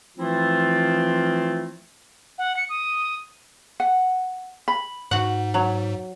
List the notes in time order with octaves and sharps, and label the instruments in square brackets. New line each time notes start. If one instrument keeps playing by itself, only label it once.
[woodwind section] E3 F3 A3 C4 E4 F4
[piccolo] F#5
C#7
D#6
[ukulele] F#5
B5
[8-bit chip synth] G#2 [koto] F#4 F#5
[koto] F#3